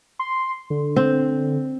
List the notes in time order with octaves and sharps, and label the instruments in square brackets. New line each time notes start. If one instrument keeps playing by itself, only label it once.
[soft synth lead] C6
D3
[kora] C4